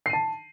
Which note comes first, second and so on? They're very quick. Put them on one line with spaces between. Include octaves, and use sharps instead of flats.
C7 D#7 A5